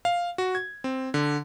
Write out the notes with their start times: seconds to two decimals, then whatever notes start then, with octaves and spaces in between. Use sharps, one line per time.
0.05 F5
0.38 F#4
0.55 G#6
0.84 C4
1.14 D3